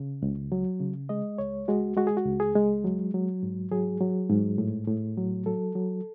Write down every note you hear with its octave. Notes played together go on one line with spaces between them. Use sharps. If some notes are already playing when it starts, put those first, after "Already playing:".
Already playing: C#3
C#2
F#3
C#3
G#3 D#5
C#2 C#5
G#3 F#4
G#3 F#4
G#4
F#4
C#2
G#4
G#3
F#3
F#3
G#2
F#3 G#4
F#3
G#2
A2
A2
F#3
F#3 A4
F#3